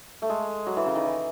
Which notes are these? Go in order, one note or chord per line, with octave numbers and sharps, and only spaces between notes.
A3
G#3
F#3
E3
C#3
D#3
E3